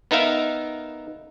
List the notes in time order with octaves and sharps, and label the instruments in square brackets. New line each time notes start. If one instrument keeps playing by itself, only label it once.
[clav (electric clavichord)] B3 D#4 A#4 E5 F5